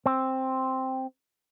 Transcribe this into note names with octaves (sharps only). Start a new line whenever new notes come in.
C4